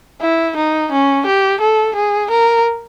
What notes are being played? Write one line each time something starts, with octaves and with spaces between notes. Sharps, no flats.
E4
D#4
C#4
G4
A4
G#4
A#4